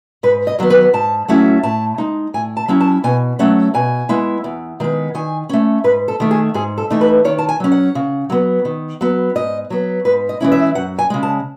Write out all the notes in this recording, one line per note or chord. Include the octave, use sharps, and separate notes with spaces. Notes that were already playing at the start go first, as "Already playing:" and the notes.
G#2 B4
D#5
D#3 F#3 B3
B4
G#2 A5
F#3 A3 C#4 E4
A2 A5
G#3 D#4
A2 G#5
A5
F#3 C#4 E4
A5
B2 G#5
F#3 A3 C#4 F#5
B2 G#5
G#3 B3 E4
E2
D#3 G#3 B3
D#3 G#5
A3 C#4
G#2 B4
A4
D#3 A3
G#4
G#2 G#4
A4
E3 A3 D#4
B4
D#3 C#5
A5
G#5
F#3 C#4
F#5
C#3
F#3 B3
D#3
F#3 B3
G#2 D#5
F#3 B3
G#2 B4
D#5
E3 G#3 C#4 E4
E5
F#2 F#5
G#5
C#3 G#3
A5